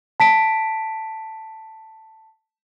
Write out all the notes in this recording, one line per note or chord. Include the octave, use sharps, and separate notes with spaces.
A5 B6 D7